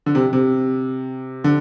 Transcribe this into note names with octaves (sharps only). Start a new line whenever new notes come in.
D3
C3
C3
D3